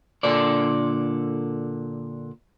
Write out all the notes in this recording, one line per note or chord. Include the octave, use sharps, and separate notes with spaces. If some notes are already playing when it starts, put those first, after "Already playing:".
A#2 D3 A4 D5